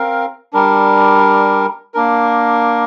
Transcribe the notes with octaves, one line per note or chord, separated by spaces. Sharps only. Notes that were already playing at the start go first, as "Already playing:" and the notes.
Already playing: C4 A#4 F5
G3 D4 A#4
A#3 D4 A#4